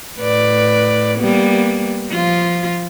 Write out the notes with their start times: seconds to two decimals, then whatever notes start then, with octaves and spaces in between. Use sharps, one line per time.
0.18 A2 B4 D5
1.18 G3 A#3 B3
2.11 F3 F4